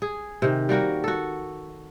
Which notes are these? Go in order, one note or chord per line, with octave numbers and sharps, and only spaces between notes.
G#4
C3 D#3
G3 A#3 F#4 A#4
F#4 A4